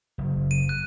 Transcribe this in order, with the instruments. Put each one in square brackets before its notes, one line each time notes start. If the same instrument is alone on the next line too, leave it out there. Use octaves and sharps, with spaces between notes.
[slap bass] F#1
[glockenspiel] D#7
F#6